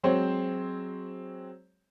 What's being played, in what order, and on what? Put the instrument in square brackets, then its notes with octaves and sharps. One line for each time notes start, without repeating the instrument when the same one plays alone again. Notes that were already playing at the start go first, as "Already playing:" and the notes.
[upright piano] F#3 G#3 C4 C5 C#5